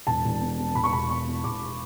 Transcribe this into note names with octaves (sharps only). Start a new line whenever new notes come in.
E1 A5
E1
B2
E2
E1 B5
C#6
E1 B5
B2 C#6
E2
E1 D6